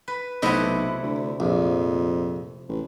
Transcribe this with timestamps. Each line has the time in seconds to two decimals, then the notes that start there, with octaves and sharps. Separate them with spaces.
0.08 B4
0.42 B1 C3 A3 E4 D#5 F#5
1.03 D2
1.40 A#1 F2
2.69 A1